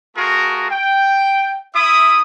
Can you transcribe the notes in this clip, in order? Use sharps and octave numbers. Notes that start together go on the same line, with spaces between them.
A3 F4 F#4 G#4 A#4
G5
E4 E5 D#6